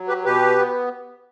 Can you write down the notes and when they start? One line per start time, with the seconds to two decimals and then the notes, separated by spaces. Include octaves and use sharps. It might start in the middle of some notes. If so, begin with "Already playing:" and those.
Already playing: F#3
0.08 G4 B4
0.25 B2 G4 B4
0.57 B3